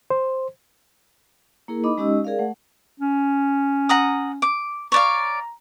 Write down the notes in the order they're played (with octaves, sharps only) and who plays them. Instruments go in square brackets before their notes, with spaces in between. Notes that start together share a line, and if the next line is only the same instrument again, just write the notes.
[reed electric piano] C5
[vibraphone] A#3 E4 G#4 A#4
D#4 D#5 B5 D6
G#3 C#4 D#4 G4 D#5 E6
G#4 A#4 D5 F5
A3 F#5
[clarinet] C#4
[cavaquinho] F#5 A#5 D#6
D6
[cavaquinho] C#5 D5 F5 [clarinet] A#5